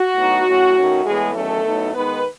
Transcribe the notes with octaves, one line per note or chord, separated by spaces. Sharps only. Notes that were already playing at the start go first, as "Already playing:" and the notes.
Already playing: F#4
A2 F#3 B3 D#4
A2 F#3 C#4
D#3 A3 C#4
A2 E3 G#3 B3 G#4
E2 D#3 F#3 A3 C#4 A4
A2 F#3 B3 D#4
D#3 G#3 B3 D#4 B4